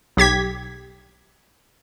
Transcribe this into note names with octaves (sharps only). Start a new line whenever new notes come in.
B1 G4 G#6 B6